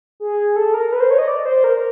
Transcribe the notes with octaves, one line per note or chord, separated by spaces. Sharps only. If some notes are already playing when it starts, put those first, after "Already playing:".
G#4
A4
A#4
B4
C5
C#5
D#5
D5
C5
A#4